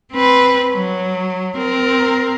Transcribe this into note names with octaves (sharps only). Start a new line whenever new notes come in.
C4 B4
F#3
C4 A#4